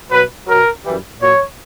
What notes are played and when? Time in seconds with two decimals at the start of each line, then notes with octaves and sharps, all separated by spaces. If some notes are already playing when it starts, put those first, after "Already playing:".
0.11 B2 F#3 B4
0.47 B2 F#3 A#4
0.84 F#2 E3 G3
1.20 A#2 F#3 C#5